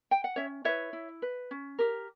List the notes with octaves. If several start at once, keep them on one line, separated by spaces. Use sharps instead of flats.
G5
F#5
C#4 C#5 E5
E4 B4 C#5 E5
E4
B4
C#4
G4 A#4